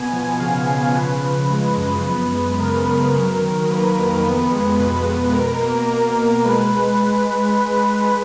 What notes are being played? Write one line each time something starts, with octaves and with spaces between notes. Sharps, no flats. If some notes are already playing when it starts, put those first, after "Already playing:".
Already playing: B2 B3 G#5
F3
C#3 F5
C#3
F3 B4
C#3
G#3
F#2
B3
G#3
C#3 A#4
C#3
F#3
D#3
A#3 B4
F2
B3
G#3
B2 B4
B2
B2 A#4
A#3
A#3
B2
G#3 B4